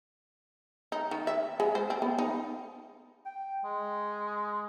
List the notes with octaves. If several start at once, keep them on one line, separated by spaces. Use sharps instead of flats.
D#4
D#3
E5
G#3
C5
C4
B3
D#4
G5
G#3